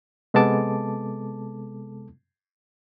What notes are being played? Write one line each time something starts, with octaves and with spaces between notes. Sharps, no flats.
C3 G#3 B3 A4 A5 D6